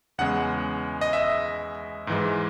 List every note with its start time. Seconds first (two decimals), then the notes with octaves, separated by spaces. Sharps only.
0.18 E2 C#3 G#3 F#5
1.01 D#5
1.13 E5
2.07 G#2 E3 G#3